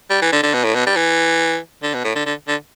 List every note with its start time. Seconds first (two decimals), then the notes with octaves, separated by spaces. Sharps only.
0.10 G3
0.22 E3
0.32 D3
0.43 D3
0.54 B2
0.64 A2
0.75 B2
0.87 G3
0.96 E3
1.83 D3
1.94 B2
2.04 A2
2.16 D3
2.26 D3
2.48 D3